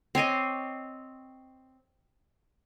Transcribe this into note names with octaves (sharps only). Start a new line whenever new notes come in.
C4 C#5 D#5 D6